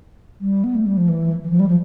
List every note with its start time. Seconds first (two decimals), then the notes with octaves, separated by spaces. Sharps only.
0.40 G3
0.64 B3
0.75 A3
0.86 G3
0.97 F3
1.08 E3
1.43 E3
1.50 F3
1.59 G3
1.68 F3